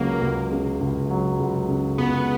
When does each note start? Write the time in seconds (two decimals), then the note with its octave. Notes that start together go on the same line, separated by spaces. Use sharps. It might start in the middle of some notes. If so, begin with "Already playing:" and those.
Already playing: C#2 C#3 F#3 A#3
0.21 C#2
0.51 C#3
0.81 C#2
1.10 F#3
1.39 C#2
1.68 C#3
1.98 C#2 B3